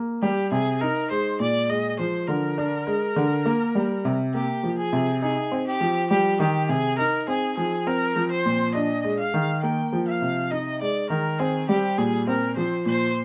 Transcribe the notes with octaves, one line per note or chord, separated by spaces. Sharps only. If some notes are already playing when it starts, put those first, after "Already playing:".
Already playing: A#3
G3 G4
C3 G#4
D#4 A#4
G#3 C5
A#2 D5
G#3 D#5
F3 C5
D3 A#4
D4
G#3
D3
A#3
G3
C3
A#3 G4
F3
G#4
C3
D#4 G#4
C4
G4
F3
G3 G4
D#3 G4
C3 G#4
D#4 A#4
C4 G#4
F3 G#4
C4 A#4
F3
C5
A#2
D4 D#5
G#3
F5
D#3
A#3 G5
F3
F5
C3
D#4 D#5
G#3 D5
D#3 A#4
C4 G#4
G3 G4
A#2 G#4
C4 A#4
F3 C5
A#2 C5